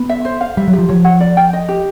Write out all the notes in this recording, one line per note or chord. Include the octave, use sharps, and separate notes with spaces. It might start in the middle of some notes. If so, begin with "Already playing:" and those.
Already playing: B3
E5
C5
F5
G3 E5
F#3
G4
F3
F3 C#5
F#5
D5
G5
D#5
G4